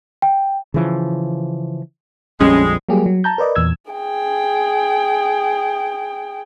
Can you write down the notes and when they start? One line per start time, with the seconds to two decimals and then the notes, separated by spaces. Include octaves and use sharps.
0.22 G5
0.74 C#3 E3 F3
2.41 A#1 F2 G3 G#3 C#4
2.89 F#3 G3 A#3 G4 G#4
3.06 F#3
3.24 A5 A#5 G6
3.38 A#4 B4 D5 D#5
3.55 E2 A#2 E6 G#6
3.91 G#4 G5